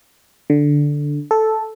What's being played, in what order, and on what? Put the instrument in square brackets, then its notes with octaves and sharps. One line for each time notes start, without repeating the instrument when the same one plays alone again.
[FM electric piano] D3
A4